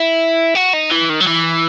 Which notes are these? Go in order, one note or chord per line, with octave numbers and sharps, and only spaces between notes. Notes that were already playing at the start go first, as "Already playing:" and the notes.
Already playing: E4
F#4
D#4
E3
D#3
F#3
E3